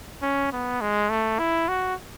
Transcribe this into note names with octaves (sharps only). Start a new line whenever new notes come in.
C#4
B3
G#3
A3
E4
F#4